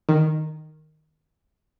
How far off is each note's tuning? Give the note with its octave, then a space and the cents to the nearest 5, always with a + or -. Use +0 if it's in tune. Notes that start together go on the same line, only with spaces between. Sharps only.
D#3 -5